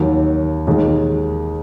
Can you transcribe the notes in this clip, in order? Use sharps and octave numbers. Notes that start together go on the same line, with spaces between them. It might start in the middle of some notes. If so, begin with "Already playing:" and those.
Already playing: D#2 D#3 F#3
D#2 D#3 G#3